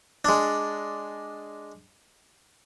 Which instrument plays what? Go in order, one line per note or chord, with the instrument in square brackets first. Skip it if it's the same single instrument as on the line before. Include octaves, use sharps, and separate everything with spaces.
[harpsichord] G#3 D4